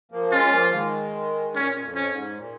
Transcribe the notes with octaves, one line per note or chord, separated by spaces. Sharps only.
F3 A#3
G#3 C#4 F4
F3 A#3
D#3 G#3
A#2 C#4
F2
C#4
G#2
A#2